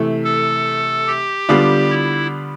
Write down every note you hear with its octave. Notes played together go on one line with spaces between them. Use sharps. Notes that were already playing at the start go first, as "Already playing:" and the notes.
Already playing: C3 E3 A3
A4
G4
D3 G3 B3 D4 F4
E4